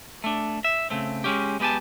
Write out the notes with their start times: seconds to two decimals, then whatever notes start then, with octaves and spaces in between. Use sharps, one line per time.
0.24 A3 D4
0.64 E5
0.90 C#3 A3 C4
1.24 G#3 C#4 G4
1.60 G#3 B3 G4 G#5 A5